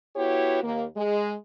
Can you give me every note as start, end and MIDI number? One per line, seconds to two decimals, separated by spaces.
0.16 0.61 59
0.16 0.61 64
0.16 0.61 66
0.16 0.61 67
0.16 0.61 73
0.63 0.85 39
0.63 0.85 58
0.97 1.36 56